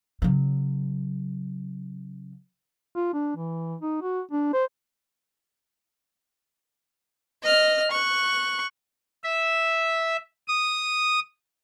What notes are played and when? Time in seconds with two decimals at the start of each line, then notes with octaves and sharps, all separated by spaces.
0.22 C#3 F#3
2.96 F4
3.14 D4
3.37 E3
3.82 D#4
4.02 F#4
4.31 D4
4.53 C5
7.42 D#5 F6
7.91 C#6 F#6
9.24 E5
10.48 D#6